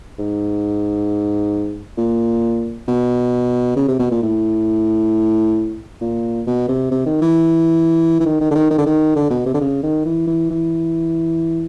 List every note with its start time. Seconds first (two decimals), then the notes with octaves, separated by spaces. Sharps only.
0.19 G#2
1.98 A#2
2.88 B2
3.76 C#3
3.88 C3
3.99 B2
4.11 A#2
4.23 A2
6.01 A#2
6.47 B2
6.69 C3
6.91 C3
7.06 D#3
7.22 E3
8.20 E3
8.26 D#3
8.41 D#3
8.51 D3
8.55 D#3
8.71 D#3
8.78 D3
8.86 D#3
9.16 D3
9.30 B2
9.46 C3
9.54 D3
9.61 C#3
9.83 D#3
10.05 E3
10.27 E3
10.50 E3